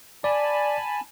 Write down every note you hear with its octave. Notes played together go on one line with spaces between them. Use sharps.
D5 G#5 A5 B5